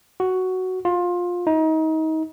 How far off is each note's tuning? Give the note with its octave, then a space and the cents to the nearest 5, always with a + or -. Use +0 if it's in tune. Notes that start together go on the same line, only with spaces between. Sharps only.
F#4 +5
F4 +20
D#4 +30